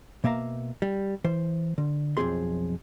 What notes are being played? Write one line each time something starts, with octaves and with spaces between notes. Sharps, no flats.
B2 A#3 E5 F5 A#5
G3
E3 C5
D3
B1 F2 F3 C4 G#4 C6